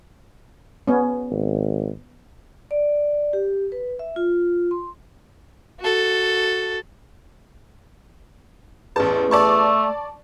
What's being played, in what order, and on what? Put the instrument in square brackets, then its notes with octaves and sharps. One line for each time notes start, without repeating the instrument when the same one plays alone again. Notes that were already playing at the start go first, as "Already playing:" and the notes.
[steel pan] B3 C#4
[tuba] G#1
[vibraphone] D5
G4
B4
E5
F4
C6
[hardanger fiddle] F#4 A4
[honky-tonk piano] A1 A5 [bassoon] E2
[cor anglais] A3 [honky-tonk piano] D5 A5 C#6